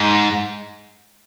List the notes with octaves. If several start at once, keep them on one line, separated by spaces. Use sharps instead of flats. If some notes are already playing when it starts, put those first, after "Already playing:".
Already playing: G#2